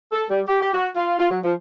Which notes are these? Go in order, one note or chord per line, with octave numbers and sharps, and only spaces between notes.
A4
G3
G4
G4
F#4
F4
F4
F#3
F3